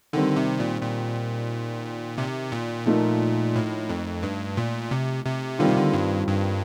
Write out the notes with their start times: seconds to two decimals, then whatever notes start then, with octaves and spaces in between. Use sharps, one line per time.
0.13 D3 D#3 G3 C4
0.36 C3
0.60 A#2
0.82 A#2
2.18 C3
2.52 A#2
2.86 F3 A3 D#4 A#4
3.55 A2
3.89 F2
4.23 G2
4.57 A#2
4.91 C3
5.25 C3
5.59 D3 D#3 G3 C4 F4
5.68 C3
5.77 D3
5.94 G2
6.27 G2